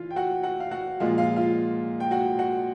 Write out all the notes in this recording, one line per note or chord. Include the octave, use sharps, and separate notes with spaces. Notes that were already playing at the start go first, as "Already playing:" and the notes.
Already playing: E3 F4 F5
G5
F#4 F#5
F#4 F#5
F5
F#4 F#5
A#2 F3 G#3 F4 F5
F4 F5
F4 F5
G5
F#4 F#5
F#4 F#5